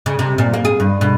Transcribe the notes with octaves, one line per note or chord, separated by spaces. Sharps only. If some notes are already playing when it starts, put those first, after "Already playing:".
C#3
C3
A#2
A#3
G#4
G2
B2